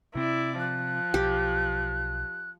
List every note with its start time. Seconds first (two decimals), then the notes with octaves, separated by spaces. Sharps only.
0.15 C3 C4 E4 D5
0.59 F3 F#6
1.14 B1 G4